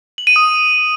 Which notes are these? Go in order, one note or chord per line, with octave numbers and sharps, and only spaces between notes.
F#7
D#7
D#6